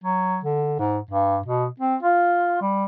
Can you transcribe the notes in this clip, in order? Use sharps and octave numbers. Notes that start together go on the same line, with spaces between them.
F#3
D3
G#2
G2
B2
C4
F4
G3